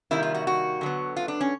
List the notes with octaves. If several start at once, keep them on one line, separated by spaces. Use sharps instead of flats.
C3 D#3 G3 A#3 E4
F4
F#4
F#4
D3 F#3 B3
F4
D4
C#4